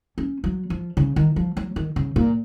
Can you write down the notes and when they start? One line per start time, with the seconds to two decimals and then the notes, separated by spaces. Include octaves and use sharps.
0.18 C#4
0.44 F#3
0.70 F3
0.97 C#3
1.16 D#3
1.36 F3
1.57 F#3
1.76 D#3
1.96 C#3
2.16 A#2